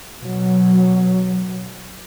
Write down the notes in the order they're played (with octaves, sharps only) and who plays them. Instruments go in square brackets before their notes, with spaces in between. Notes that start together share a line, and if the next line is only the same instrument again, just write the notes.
[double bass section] B2 F#3